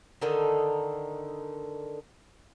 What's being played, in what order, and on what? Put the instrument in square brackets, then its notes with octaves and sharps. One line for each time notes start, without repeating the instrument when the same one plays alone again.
[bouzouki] D3 D#3 D#4 A4